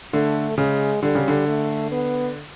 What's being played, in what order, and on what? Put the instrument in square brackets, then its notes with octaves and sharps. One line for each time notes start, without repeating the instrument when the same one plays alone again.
[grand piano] D3 [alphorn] A3
[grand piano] C#3 [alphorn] G#3
[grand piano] D3 [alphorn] G3
[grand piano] C#3
D3
[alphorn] A3
B3